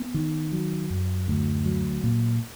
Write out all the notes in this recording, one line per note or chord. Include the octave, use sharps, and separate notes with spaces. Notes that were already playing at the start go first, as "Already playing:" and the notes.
Already playing: B3
D#3
F#3
F#2
D2
F#3
A#2